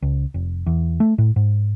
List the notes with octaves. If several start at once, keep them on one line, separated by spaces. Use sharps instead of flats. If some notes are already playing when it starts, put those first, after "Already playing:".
C#2
F1
E2
A3
A2
G#2